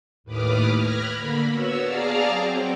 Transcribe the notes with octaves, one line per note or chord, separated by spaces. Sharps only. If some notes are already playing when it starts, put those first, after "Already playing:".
D#2 A2 B4 D6 D#6 F6
B5 F6 F#6 G#6 A#6
D3 A#3 B5
B3 F#4 C#5 E6
G#4 D5 F5 A5 A#5 F6
F#3 C4